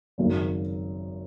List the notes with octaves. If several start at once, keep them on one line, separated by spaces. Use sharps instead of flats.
G#1 F#2 C#3